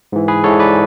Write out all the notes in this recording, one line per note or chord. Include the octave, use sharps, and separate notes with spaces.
G#2 E3
G#4 B4
G#2 E3 A4 C#5
B4 D5